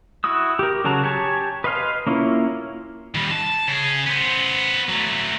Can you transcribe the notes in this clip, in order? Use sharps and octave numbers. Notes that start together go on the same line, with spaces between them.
E4 F#4 D#6 E6
G4 A#4
C#3 F#3 F#4 A5 A#5
G4 C#5 G#5 A5
B4 D#5 F5 C6 F6
A#3 C#4 E4 F4
D#3 G3
A5
C#3 G#4
B3 C5
F#3 A3